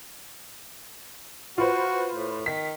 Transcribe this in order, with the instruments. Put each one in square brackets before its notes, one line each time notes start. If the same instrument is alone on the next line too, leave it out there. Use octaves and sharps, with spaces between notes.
[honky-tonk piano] F4 B4 C5 [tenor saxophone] F#4
[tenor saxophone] A2
[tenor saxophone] D#3 [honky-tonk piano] B6